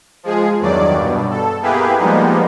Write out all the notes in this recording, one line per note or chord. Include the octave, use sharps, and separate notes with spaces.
F3 G#3 G#4
E2 G2 D#3 F#3 D5
G2 B2
A4
A#3 B3 E4 G4 G#4 B4
F3 G3 G#3 A#3 B3 D#4